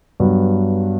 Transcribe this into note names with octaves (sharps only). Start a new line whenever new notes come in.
G2 F#3 B3